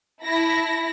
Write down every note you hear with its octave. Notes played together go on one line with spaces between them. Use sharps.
E4 A5 B5 A#6